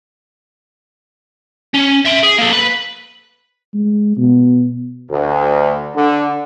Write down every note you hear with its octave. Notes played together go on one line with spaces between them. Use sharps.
C#4
E5 C6
G#4
A#3 A4
B4
G#3
B2
D2
D3